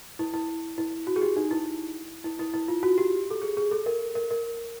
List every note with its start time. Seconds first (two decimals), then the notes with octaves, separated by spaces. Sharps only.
0.19 E4
0.34 E4
0.78 E4
1.07 F#4
1.16 G#4
1.22 G4
1.36 D#4
1.51 E4
2.24 E4
2.39 E4
2.54 E4
2.68 F4
2.83 F#4
2.98 G4
3.30 A4
3.42 G#4
3.57 G#4
3.71 A4
3.86 A#4
4.15 A#4
4.31 A#4